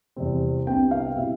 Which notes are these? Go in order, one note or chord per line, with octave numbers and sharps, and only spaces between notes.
E2 C3 G3 C4
C2 C3 G3 B3 D4 G5
F5
B2 G3 C4 E4 E5